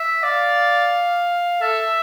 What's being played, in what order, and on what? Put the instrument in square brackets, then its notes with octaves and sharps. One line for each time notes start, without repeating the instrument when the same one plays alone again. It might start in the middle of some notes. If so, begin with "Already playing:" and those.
Already playing: [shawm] E5
[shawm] D5 [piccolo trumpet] F5
[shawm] A4 [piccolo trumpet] E5